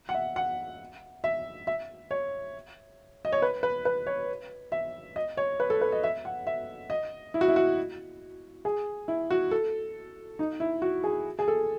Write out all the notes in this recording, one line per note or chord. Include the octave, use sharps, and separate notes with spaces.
F#5
E5
F#5
E5
E5
C#5
D#5
C#5
B4
B4
B4
C#5
E5
D#5
C#5
B4
A4
B4
D#5
E5
F#5
E5
D#5
E4
F#4
E4
F#4
G#4
E4
F#4
A4
D#4
E4
F#4
G#4
G#4
A4